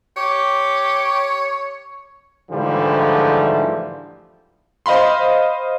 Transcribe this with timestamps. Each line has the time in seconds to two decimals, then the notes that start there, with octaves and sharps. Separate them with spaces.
0.17 G4 C#5
2.51 G#2 D3 E3 F3 G3 A3
4.86 C5 D#5 F5 B5 C6